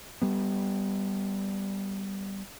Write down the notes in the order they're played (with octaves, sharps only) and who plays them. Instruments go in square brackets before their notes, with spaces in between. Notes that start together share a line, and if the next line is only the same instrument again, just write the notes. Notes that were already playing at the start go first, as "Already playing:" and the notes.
[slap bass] G3 B3